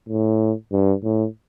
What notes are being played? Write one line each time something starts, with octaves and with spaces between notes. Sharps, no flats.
A2
G2
A2